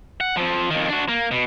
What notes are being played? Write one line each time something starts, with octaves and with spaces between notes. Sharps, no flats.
F#5
F3 C4
F2 D#3
D4 F#4
A#3
B2